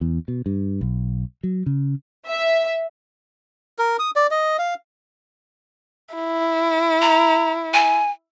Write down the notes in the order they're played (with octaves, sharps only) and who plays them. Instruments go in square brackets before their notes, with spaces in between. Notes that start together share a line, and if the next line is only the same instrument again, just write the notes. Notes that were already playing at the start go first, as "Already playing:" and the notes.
[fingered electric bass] E2
B2
G2
B1
F#3
C#3
[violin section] E5
[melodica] A#4
D#6
D5
D#5
F5
[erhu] E4
[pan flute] A#5
G#5